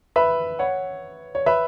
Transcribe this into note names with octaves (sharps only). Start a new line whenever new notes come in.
B4 E5
C#5 F#5
C#5
B4 E5